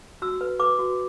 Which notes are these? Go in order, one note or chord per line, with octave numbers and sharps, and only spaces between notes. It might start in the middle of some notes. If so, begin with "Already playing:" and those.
F#4 E6
B4
B4 D6
F#4